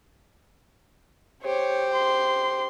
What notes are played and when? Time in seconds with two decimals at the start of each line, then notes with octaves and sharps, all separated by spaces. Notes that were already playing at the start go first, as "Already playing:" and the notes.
1.43 G4 C5 C#5
1.93 C6